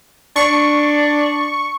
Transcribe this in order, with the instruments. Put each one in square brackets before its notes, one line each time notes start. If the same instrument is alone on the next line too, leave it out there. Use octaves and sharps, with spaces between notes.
[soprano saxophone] D4 [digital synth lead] C#6